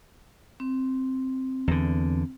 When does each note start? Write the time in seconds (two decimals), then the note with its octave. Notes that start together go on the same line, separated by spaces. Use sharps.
0.60 C4
1.68 E2 D3